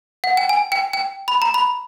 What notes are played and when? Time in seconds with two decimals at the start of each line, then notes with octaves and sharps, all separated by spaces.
0.24 F#5
0.37 G5
0.49 G#5
0.72 G5
0.93 G5
1.28 B5
1.42 A#5
1.54 B5